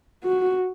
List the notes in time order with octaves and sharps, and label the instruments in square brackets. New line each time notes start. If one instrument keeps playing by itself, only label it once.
[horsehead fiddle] F#4